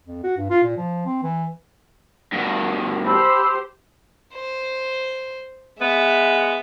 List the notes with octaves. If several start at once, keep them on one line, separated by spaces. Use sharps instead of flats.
F2
F#4
G2
F4
A#2
F3
C4
E3
G2 B2
G4 C5 A5 B5 E6
C5
G#3 B3 E5